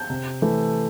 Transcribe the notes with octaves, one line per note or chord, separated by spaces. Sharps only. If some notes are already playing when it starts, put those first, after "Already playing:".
Already playing: G6
C3
E3 A3